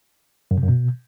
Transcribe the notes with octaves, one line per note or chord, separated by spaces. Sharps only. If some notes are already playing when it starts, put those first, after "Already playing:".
F#2
C3
F#2
B2